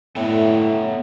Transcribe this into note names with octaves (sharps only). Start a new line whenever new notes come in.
A2 B3 A4 C#5 E5 G5